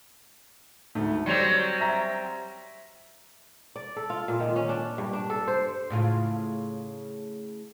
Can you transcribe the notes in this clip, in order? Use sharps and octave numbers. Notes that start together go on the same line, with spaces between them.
D2 G#2 A3
F#3 G3 C4 C#7 F7
E5 A#5 A#6
D5
A4
F4
A#2
D#3
C#4
D4
G2
D4
A4
C5
A2 C#3 F4